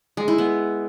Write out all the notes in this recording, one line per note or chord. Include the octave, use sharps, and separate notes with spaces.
G#3
E4
B3